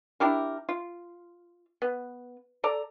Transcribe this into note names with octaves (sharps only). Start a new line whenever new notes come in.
D4 E4 G4 A#4
F4
B3
A4 D5 A#5